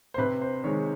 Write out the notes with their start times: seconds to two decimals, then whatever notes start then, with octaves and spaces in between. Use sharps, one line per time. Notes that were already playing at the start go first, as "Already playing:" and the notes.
0.14 C5
0.18 C3 B4
0.41 C5
0.64 D#3 G#3 C#5